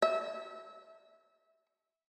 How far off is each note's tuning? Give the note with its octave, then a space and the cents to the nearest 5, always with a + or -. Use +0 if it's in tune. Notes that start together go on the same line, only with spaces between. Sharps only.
E5 -15